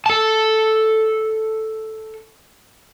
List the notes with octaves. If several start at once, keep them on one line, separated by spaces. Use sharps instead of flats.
A4 A5